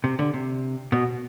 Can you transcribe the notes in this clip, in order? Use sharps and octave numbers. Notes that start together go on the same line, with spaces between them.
C3
D3
C3
B2